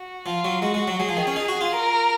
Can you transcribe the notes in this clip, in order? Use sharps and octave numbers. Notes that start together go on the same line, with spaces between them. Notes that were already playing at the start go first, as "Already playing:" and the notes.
Already playing: F#4
F3 F4
F#3
G#3 F#4
G#3
F#3
F#3 G#4
F3
D#3
C#4
D#4
F#4
F4
A#4